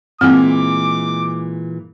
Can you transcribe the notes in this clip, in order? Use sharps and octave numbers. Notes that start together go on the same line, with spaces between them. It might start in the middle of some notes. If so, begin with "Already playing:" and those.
A#2 E3 G#3 C4 D6